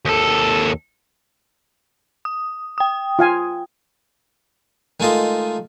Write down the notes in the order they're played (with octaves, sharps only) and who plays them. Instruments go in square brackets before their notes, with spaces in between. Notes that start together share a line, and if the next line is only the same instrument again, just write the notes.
[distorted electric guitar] D#2 A4
[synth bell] D#6
G5 D#6
[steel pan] F4 F5 G#5
[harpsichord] D#3 G#3 A3 F4 D#5